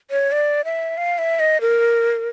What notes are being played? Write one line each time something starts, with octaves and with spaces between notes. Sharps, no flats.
C#5
D5
E5
F5
E5
D#5
A#4